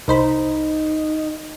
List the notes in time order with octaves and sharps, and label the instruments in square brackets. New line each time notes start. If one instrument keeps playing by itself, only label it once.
[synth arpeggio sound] C2 C5 B5 [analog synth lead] D#4